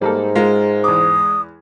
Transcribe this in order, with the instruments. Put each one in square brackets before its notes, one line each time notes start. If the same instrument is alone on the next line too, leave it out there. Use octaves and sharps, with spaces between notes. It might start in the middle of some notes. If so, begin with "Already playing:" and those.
[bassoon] G#2 [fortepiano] G3 A#3 A4
[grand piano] G#3 [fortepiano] F4 A#4 F5
[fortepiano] E2 D6 [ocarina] D#6